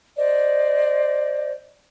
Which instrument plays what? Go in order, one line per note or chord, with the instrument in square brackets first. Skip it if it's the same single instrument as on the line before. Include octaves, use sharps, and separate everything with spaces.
[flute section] C5 D5 D#5